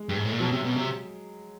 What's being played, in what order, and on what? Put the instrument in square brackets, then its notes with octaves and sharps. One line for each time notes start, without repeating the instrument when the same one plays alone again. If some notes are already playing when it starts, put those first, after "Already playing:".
Already playing: [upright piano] G#3
[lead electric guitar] G2
G#2
A2
A#2
[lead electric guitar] B2 [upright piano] F#3
[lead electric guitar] C3
B2
C3